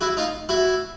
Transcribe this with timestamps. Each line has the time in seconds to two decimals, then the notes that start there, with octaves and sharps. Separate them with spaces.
0.01 E4 F#4
0.17 D#4 F4
0.49 E4 F#4